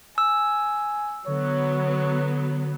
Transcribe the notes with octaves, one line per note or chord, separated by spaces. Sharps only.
G#5 E6
D3 F#3 B3 C#5